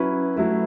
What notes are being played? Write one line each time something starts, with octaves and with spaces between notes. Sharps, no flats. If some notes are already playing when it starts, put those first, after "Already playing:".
Already playing: F#3 C#4 E4 B4
F#3 A3 E4 B4